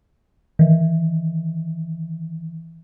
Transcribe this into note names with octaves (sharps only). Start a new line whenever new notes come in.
D#3 E3